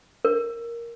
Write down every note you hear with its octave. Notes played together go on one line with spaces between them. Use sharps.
A#4